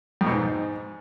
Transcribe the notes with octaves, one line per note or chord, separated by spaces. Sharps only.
F2
B2
G#2